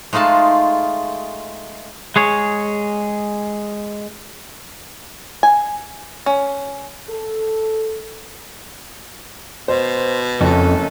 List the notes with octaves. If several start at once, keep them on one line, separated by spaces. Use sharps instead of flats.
G#3 A3 D#4 F4 A5
G#3 G#4 C#5
G#5
C#4
A4
B2 C5
F#1 F2 C#4 A4